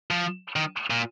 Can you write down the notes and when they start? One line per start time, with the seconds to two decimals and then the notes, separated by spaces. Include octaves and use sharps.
0.11 F3
0.56 D#3
0.90 A#2